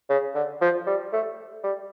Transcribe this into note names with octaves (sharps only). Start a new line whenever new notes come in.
C#3
D3
F3
G3
A3
G3